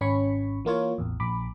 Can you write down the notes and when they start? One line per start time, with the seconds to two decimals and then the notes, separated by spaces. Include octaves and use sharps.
0.01 G#1 C#4 C#5 B5 C#6
0.65 E3 A#3 F4 C#5
0.98 A1 E2
1.20 A#1 B5 D6